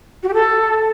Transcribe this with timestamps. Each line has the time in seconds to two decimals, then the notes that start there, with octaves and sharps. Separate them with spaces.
0.23 F#4
0.28 G4
0.34 A4